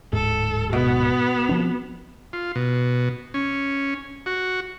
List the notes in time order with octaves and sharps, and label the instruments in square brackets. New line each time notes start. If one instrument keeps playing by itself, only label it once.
[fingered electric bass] D1 G#2 [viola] A4
[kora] B2 [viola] B3
[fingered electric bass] F3 C4
[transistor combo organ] F4
B2
C#4
F#4